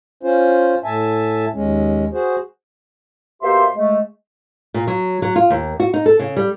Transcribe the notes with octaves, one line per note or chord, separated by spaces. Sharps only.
C#4 F4 C5
A2 E5 G#5 A5
D#2 G#3 C#4
F#4 G#4 C5
B2 A#3 G4 C5 E5 C6
G#3 A3
A#2
F#3
F#3
F4
D#2
F#4
D#4
A4
C#3
G3